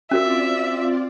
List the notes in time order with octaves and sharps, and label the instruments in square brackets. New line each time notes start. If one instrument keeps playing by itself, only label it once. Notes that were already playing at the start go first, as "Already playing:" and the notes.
[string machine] C4 F4 D5 [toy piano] C#4 F#4 A#4 [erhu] E5